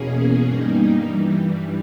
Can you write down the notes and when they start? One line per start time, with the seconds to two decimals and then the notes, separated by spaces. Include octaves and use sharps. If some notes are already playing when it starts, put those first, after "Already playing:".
Already playing: E2 B2 A#3 C#4 G#4
0.46 G2 G3 A#3 D#4
1.03 G2 E3 G3